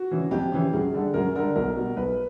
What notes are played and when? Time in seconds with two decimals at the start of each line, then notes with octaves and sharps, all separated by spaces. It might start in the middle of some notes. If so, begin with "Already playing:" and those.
Already playing: F#4
0.11 C#3 E3
0.31 F2 G4
0.52 C#3 E3
0.73 F#2 G#4
0.93 D3 G3
1.14 F#2 A#4
1.35 D3 G3 A#4
1.56 B1 A#4
1.76 B2 G3
1.96 B1 B4